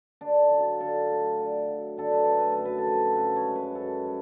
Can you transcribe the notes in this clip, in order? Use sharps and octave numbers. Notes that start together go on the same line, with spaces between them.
D3 D4
F#3
F4
D3 A4
A3
D3
F#3
D3 A4
B4
A3 A4
B4
A4
F#2
B4
A4
F3
F#2 B4
C#5
G#3
B4
F#2 A4
F3